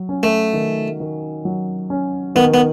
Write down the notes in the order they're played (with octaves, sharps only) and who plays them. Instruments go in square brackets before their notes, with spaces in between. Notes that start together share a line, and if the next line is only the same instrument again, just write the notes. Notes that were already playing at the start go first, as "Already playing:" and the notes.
Already playing: [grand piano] F#3
C#4
[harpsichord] A3
[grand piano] D#3
D#3
F#3
C#4
[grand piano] D#3 [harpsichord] B3
[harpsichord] B3